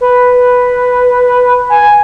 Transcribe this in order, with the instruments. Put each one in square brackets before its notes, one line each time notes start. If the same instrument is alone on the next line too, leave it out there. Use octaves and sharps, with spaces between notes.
[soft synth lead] B4
G#5